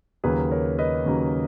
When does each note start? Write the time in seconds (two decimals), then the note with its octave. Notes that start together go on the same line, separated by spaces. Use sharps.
0.24 D#2 C#3 F#3 A#3 G#4 B4
0.51 A#4 C#5
0.79 B4 D#5
1.06 D#2 C#3 F#3 A#3